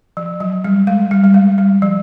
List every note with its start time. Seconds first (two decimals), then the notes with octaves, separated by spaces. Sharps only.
0.17 F3
0.40 F#3
0.64 G3
0.87 G#3
1.11 G3
1.24 G3
1.34 G#3
1.58 G3
1.82 F3